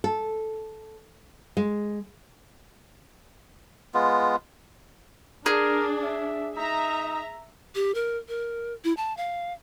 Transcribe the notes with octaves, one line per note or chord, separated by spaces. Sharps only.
A4
G#3
G#3 B3 F4
D4 G#4 A#4
E5
D#4 E5 A#5
G4
A#4
A#4
E4
A5
F5